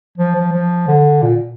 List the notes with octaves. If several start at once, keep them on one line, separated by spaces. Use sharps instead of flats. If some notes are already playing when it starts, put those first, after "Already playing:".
F3
F3
F3
D3
A#2